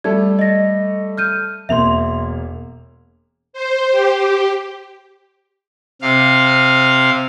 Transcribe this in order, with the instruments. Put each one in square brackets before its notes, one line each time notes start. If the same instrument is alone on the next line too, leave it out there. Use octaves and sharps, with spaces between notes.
[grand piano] G3 A3 A4 [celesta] G#6
[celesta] D#5 A#6
F6 G6 D#7
[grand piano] E1 A#3 F7 [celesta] E5 C6
[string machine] C5
G4
[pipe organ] C3 F5